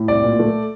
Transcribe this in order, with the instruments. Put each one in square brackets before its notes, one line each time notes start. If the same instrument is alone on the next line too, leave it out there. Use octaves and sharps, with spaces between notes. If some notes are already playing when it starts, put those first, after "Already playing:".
Already playing: [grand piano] A2
C2 D5
A#2
A3